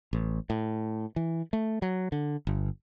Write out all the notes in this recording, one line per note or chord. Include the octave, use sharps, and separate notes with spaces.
A1
A2
E3
A3
F#3
D3
G1